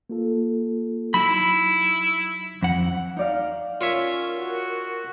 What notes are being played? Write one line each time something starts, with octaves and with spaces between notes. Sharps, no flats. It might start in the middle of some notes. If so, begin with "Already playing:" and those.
A#3 F4 A4
F#3 D#4 E4 B5
F2 F#5
D#4 D5 F5
C#4 F4 A#4 C#5 E5
F#4